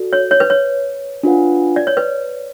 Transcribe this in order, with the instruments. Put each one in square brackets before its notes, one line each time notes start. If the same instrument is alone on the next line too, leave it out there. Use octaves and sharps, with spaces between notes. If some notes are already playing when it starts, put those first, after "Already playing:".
Already playing: [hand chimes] F#4 A4 D5
[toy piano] C#5
C#5
B4
C#5
[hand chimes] D4 F4 B4 F#5
[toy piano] D5
C#5
B4